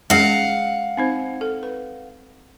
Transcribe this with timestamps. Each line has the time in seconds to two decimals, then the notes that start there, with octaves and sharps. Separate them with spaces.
0.10 G#3 C#4 G#4 F5 F#5
0.97 C4 D#4 C5
1.41 A4
1.63 B4